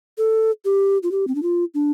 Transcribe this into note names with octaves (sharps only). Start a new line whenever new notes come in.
A4
G4
F4
G4
C4
D4
F4
D4